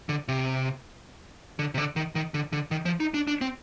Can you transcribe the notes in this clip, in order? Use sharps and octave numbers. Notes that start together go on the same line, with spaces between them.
D3
C3
D3
C3
D3
D#3
D#3
D3
D3
D#3
F3
D#4
D4
D4
C4